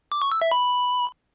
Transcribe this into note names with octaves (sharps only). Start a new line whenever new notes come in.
D6
C#6
E6
E5
B5